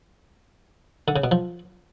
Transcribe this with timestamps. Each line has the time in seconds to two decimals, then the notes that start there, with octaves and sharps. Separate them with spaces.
1.08 D3
1.16 C#3
1.24 B2
1.31 F3